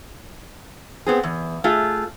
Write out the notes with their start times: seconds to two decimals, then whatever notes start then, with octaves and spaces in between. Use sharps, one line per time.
1.06 B3 C4 G#4
1.23 E2
1.64 A3 F4 G#4